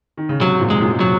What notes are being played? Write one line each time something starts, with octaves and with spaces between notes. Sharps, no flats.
D#3
C#3
G#2 C3 F#3
F#2 A#2
G#3
F#2 A#2
C3 F#3